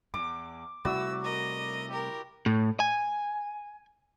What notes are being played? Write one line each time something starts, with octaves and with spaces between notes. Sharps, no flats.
E2 D6
C3 G3 A3 E4 F#4 D5 E6
A#4 D#5
G4 A#4
A2
G#5